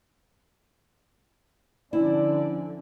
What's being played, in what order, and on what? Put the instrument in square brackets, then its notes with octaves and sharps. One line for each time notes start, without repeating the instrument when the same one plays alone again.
[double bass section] D3 [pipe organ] F3 C#4 [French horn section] D4 D5 [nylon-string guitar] E4